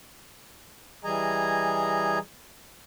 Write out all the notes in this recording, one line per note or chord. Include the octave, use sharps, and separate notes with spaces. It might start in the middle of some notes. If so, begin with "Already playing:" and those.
E3 G3 G#4 D#5 G#5 A#5